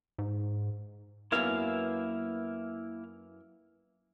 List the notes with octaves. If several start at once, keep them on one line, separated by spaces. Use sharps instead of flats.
G#2
F#2 A#3 B3 E4 A#4 F5